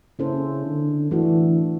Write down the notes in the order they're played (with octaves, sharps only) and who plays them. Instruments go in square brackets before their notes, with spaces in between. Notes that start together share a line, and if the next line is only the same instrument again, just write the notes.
[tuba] C#3 [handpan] A#3 C#4 E4 A4 C5
[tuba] D3
[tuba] E3 [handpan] A3 D4 F#4 A4